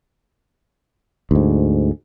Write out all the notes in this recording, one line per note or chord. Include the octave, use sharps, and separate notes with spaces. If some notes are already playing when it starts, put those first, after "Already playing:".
D2 G#2